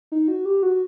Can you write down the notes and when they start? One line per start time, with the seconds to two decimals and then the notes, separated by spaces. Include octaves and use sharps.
0.12 D#4
0.28 F#4
0.45 G4
0.63 F#4